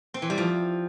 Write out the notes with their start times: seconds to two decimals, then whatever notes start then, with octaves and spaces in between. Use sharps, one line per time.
0.14 C4
0.22 E3
0.30 G3
0.38 F3